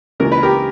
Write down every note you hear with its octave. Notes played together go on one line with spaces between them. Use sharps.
C#2 C#3 E3 A#3 A#4
B4
G4 A#4